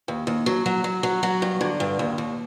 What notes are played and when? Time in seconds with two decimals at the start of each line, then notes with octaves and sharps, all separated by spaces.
0.08 D#2
0.27 D#2
0.46 F#3
0.66 F#3
0.84 F#3
1.03 F#3
1.23 F#3 F#4
1.42 G2
1.61 D3
1.80 G2
1.99 D#2
2.18 D#2